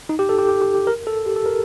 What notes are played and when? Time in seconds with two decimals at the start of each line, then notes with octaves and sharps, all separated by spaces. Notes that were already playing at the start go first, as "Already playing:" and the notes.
0.09 D#4
0.19 G4
0.29 A4
0.38 G4
0.49 G4
0.62 G4
0.75 G4
0.87 A#4
1.07 A4
1.26 G4
1.36 A4
1.46 A#4